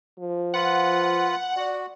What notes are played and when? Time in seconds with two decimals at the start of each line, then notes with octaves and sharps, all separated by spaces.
0.19 F3
0.54 F4 B4 F#5
1.57 F#4 D5